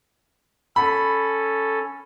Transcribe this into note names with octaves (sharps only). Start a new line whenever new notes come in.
C#4 A4 B5